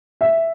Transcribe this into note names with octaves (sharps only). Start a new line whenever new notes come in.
E5